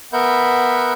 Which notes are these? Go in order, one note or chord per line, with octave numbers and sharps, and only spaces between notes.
B3 A#4 E5 F#5 B5 G6